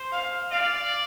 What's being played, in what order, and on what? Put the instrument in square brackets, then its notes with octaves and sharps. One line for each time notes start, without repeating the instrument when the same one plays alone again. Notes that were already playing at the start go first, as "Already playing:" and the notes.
Already playing: [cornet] C5
[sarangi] F5
[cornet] D5 [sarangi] F5